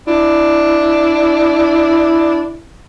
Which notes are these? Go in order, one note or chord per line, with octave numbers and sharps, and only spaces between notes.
D4 E4